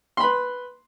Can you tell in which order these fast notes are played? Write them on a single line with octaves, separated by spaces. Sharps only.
C6 B5 B4